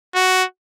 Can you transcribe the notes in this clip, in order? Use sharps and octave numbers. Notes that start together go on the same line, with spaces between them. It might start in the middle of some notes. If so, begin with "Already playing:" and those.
F#4